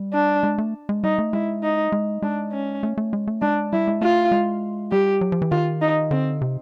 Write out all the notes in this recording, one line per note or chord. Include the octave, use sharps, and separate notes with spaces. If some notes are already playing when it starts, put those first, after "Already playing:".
Already playing: G3
D4
G#3
A3
G#3
G3 D#4
A3
G#3 E4
D#4
G#3
G#3 D4
C#4
A3
A3
G#3
A3
G#3 D4
G3 E4
G#3
A3 F4
G#3
G3 G4
F#3
F3
E3
D#3 F4
D#4
D3 C4
C3